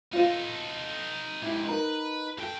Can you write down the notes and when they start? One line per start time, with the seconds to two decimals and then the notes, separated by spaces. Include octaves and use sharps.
0.13 D#4 F4 A4 C5
1.42 G#2 E4 G4
1.65 D#4 A#4 B4
2.38 G2 A4 G5